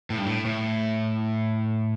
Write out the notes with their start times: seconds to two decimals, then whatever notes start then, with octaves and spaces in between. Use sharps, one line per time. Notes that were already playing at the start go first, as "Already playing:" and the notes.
0.10 A2
0.18 G2
0.26 A2
0.45 A2